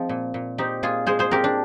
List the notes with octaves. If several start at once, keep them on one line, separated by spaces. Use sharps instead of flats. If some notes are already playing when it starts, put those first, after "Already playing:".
Already playing: F3 G#3 C4 D#4
A#2
A#2
C4 D#4 G4
A#2 F4 G#4
G#3 G#4 C5
G#4 C5
C4 G4 A#4
D4